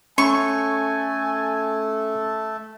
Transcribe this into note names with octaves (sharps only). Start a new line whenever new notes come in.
A3 C#4 A4 G#5 C#6